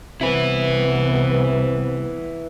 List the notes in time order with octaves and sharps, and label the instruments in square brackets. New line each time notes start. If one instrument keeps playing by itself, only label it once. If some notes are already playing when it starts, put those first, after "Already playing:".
[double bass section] C2 B3 [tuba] C3 [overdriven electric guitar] E4 B4